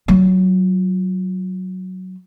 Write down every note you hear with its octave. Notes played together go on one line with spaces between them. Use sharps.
F#3 F4